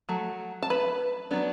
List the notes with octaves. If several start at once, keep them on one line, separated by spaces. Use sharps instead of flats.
F#3 A3
A5
B4 B5
F#3 B3 D4